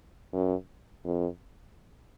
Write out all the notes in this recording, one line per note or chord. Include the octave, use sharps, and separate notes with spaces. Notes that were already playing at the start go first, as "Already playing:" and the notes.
F#2
F2